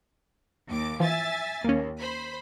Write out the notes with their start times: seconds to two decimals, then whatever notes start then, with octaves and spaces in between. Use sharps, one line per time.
0.69 D#2 D6
1.00 E3 F3 E5 G#5 A6
1.64 D#2 A#3 C#4
1.99 C5 B5